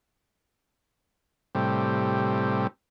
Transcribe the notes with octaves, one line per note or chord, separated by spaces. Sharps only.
A2 C3 G3